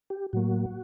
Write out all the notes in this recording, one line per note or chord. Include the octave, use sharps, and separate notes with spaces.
G4
A2 F#3 A#3 F#4